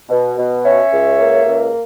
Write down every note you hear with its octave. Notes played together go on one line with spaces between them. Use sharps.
B2
B2
C#4 C#5 E5
C#2
A#3
C#2